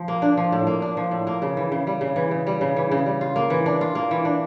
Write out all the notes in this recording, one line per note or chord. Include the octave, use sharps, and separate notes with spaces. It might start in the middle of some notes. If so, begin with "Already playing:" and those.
Already playing: F3
A#3
D4
F3
A2
A#3
D4
F3
A2
A#3
C#3
E3
C#3
G3
C#3
E3
C#3
G3
C#3
E3
C#3
G3
F4
A#3
E3
D4
F4
A#3
E3
D4